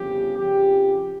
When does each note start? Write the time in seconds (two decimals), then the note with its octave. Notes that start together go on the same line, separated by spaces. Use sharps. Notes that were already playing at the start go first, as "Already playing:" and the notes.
Already playing: G1 F2 C#3 G4
0.37 F2 C#3 F3 G4